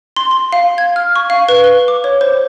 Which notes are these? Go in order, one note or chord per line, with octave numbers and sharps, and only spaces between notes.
C6
C6
F5
G#6
F6
C#6
F5
B4
G7
D6
C#5
C5